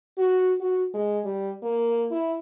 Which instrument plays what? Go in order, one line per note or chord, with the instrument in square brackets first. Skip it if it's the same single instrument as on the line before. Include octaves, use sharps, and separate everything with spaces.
[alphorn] F#4
F#4
G#3
G3
A#3
E4